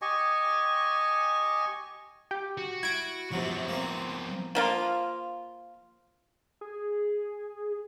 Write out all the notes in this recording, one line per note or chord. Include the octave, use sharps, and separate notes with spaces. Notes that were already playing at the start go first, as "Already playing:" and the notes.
G4 D#5 G#5 C#6
G4
F#4
E4 G#6 D7
F#2 C3 F3 F#3 B3
A#3 C4
F3 A#3 F4
G#4